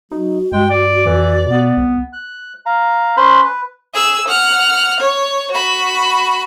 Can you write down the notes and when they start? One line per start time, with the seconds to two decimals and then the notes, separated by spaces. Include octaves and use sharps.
0.12 F#3 D#4 F#4
0.52 G2 G#3 G5
0.70 D5 D6
1.06 F2 E3
1.46 B2 B3
1.77 C2
2.13 F#6
2.66 F5 A#5
3.17 C#4 B4 C5 B5 C6 F#6
3.45 B4
3.94 G#4 E6
4.28 F#5 F6
5.00 C#5
5.51 F#4 B5